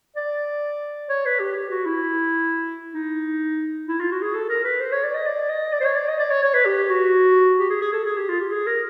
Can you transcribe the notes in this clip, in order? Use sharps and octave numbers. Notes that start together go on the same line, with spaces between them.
D5
C#5
B4
G4
G4
F#4
E4
D#4
E4
F4
F#4
G#4
A4
A#4
B4
C5
C#5
D5
D#5
D5
D#5
D5
C5
C#5
D5
D#5
D5
C#5
C#5
B4
G4
F#4
G4
G#4
G#4
A4
G#4
G4
F4
G4
G#4
A#4